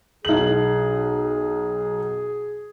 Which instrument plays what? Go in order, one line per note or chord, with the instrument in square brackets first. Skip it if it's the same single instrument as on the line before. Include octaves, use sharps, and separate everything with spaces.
[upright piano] B1 F#7 [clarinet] G#4